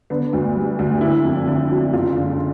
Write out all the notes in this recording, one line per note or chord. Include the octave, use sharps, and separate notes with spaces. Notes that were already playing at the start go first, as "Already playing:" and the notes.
D3 B3
D2
G3
D2
D3 E4
F2
D3
F#3
F#1 F4
D3